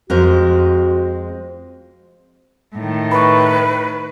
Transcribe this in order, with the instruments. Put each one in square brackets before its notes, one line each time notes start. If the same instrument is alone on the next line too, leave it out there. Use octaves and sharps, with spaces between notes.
[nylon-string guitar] F2 G#3 A#4 [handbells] C4 C5 [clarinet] F#4
[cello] A2 D#3
[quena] B4 [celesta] B5 C#6